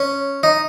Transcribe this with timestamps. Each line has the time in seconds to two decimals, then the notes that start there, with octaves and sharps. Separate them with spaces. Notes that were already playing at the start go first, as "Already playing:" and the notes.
Already playing: C#4
0.43 D#4